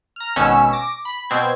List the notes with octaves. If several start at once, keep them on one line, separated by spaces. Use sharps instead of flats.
A#5 F6
G#1 B2 C#4 E6 B6 E7
D6 A#6
B5
B2 C4 G#6